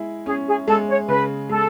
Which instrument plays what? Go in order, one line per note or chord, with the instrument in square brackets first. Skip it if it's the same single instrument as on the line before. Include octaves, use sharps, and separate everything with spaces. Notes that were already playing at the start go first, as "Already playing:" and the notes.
Already playing: [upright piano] G#3 E4
[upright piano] C#4 [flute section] G#4
[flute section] G#4
[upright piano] G#3 [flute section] A4
[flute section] C#5
[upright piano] C#3 [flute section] B4
[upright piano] G#3 [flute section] A4